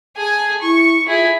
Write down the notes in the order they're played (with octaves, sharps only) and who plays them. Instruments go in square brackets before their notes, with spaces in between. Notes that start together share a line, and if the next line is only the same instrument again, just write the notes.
[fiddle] G#4 G#5 [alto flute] A5
[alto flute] E4 [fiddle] C#6
[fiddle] E4 G#4 [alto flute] F4